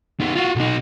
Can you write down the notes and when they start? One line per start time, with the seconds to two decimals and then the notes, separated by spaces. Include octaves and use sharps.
0.20 D#3 B3
0.36 F4 F#4
0.56 B1 D#4